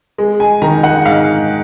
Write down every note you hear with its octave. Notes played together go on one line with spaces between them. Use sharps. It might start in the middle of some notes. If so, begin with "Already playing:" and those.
G#3
G#5
D#3 A#5
F#5
G#2 F5